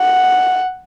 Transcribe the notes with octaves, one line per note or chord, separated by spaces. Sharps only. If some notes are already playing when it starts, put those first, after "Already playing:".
Already playing: F#5